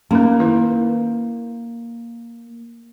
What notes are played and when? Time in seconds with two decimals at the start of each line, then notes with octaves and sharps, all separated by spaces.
0.11 A#3 C#4 D#4 A#4
0.39 D#3 E4 B4